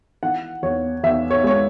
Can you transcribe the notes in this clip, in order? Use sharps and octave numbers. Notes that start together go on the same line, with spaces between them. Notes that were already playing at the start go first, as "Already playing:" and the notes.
E3 F#5
E2 C#5
E2 E5
C#5
G#3 C#5